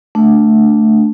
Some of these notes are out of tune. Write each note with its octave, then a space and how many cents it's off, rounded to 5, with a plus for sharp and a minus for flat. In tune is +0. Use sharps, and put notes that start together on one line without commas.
A3 +0 D4 +0